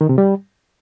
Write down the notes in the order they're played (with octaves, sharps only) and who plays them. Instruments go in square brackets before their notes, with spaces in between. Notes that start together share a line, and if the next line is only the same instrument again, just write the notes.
[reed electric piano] D#3
C3
G3